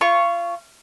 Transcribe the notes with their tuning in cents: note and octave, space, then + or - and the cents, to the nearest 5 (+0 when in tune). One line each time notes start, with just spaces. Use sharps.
F4 -25 C#6 +0